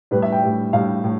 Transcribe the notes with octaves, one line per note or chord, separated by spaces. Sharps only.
A2 G3 B4
E5
G5
A2 G3
A2 G3 F5
A2